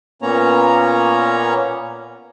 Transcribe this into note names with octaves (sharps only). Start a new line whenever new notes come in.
A#2 A#3 B3 C#4 C#5 A#5